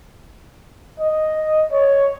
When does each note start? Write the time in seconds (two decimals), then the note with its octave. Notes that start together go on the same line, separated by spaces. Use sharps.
1.00 D#5
1.72 C#5